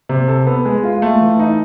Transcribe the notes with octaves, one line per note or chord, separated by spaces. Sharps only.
C3
A4
B3
G#3
F4
A3
E3
D#4